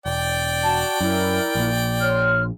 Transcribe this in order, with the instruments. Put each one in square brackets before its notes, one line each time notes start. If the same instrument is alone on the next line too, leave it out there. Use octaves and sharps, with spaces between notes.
[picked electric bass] E1 [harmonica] D5 G5
[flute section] F#4 A5
[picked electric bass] F#2 [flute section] E4 A#4
[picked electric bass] A#1 A#2
[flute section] C#5 C6 F6